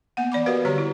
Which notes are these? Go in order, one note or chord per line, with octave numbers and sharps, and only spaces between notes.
A#3 B3 F#5
E3 D5 B5 D6
F#4 G4 A#4 B4 D#5 F5
D3 G3 G4 C#5 A#5
E4